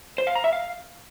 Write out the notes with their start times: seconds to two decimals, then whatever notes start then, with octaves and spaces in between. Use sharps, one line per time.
0.18 C5
0.27 F5
0.35 A#5
0.44 E5
0.53 F5